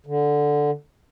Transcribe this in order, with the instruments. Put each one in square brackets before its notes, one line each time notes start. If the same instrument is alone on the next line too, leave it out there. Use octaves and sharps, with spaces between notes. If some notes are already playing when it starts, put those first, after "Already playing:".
[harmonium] D3